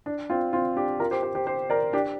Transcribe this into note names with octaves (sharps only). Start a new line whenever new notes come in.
D4
C4 F4
C4 F4
D4 G4
F4 A#4
G4 C5
G4 C5
G4 C5
G4 C5
A#4 D5
D4 G4